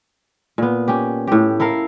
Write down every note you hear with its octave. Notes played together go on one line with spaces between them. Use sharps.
A#2 B3
C#4 G4
A2 G4
E4 A4 A#4 F5